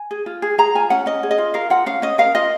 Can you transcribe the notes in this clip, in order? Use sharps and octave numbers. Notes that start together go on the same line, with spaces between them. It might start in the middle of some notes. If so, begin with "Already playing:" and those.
Already playing: G#5
G#4
F4
G#4
G#4 A#5
F4 G#5
C#4 F#5
C#4 D#5
G#4
D#5
F4
A#4 F5
F4 F#5
C#4 F5
C#4 D#5
A#4 F5
F4 D#5